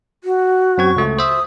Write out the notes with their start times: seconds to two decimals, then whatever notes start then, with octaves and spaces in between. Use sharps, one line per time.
0.24 F#4
0.78 F#2 C4 C#6 G#6
0.96 C#2 A3
1.19 C5 E5 D#6